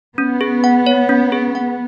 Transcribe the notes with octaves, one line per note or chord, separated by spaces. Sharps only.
B3 C#4
G#4
F#5
C#5
C#4
G#4
F#5